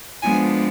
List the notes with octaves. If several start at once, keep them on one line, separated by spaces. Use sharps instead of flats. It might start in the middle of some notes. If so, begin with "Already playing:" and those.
F3 G#3 B3 D4 G#5